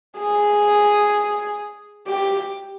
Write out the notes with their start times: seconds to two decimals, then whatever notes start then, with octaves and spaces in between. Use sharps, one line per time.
0.19 G#4
2.07 G4